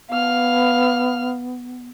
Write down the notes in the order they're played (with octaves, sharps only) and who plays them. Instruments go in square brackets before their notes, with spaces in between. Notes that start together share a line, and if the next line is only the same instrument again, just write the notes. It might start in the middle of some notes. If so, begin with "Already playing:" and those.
[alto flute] B3 [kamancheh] F5 F6